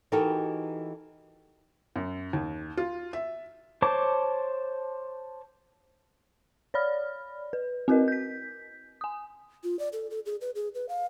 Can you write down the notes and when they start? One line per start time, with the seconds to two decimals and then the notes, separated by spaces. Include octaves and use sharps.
0.12 E3 D#4 F#4 G4 A4 A#4
1.96 F#2
2.33 D#2
2.77 F4
3.13 E5
3.82 C5 C#5 A5 D6
6.74 C#5 D5 B5 F6
7.53 B4
7.88 C4 F#4 A#4 B4 D#5
8.08 G6 B6
9.01 G#5 D#6
9.64 F4
9.79 D5
9.93 A4
10.11 A4
10.26 G#4
10.41 B4
10.55 G#4
10.75 B4
10.89 F5